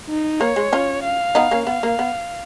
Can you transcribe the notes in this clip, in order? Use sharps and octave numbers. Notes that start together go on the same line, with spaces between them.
D#4
A#3 C#5
G#3
C#4 F4
F5
B3 D#4
A#3 C#4
B3 F5
A#3
B3